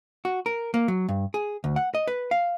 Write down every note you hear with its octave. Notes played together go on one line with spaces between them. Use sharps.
F#4
A#4
A#3
F#3
G2
G#4
D2
F#5
D#5
B4
F5